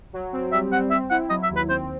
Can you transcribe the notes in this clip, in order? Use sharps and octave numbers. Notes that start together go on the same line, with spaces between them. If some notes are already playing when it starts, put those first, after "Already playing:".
F#3
C4
G3 E5
C4 F#5
C4 E5
E4 F#5
F#3 D#5
E5
D#2
B4
C4 C5